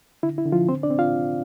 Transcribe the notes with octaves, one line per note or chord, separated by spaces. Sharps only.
D3 E4
E4
D3
F3 F4
C4 C5
D4 D5
C4
F4 F5